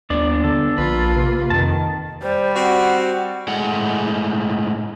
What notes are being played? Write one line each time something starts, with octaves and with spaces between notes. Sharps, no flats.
D#2 B3 D4 D5
D3 A4
A#1 A#3 F4 B4
C3
F2 D#3 A5
G3 C5
C4 F#4 F#5
A2 G#3 F#5